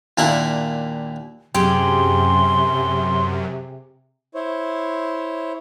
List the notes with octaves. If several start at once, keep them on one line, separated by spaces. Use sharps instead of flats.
D#2 A#2 D4 E4 A#4 F#5
F#2 C3 G4 G#4 C6
E4 C5 C#5